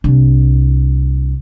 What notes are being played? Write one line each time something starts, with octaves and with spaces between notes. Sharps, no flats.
C2 D4